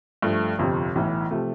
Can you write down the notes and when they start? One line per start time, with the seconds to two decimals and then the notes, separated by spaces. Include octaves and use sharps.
0.22 G2 F3 A3
0.59 G1 F2 C3
0.95 B1 A2 E3
1.31 C3 F3 A3